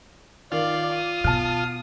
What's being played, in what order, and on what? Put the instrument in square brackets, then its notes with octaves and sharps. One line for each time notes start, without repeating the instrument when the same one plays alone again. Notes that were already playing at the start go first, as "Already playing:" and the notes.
[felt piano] D#3 [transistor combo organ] F4 [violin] D5 F5
[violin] D#6
[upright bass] B2 [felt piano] A5 F6